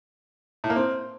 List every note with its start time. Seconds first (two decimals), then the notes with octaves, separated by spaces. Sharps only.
0.64 A2
0.70 A#3
0.76 C4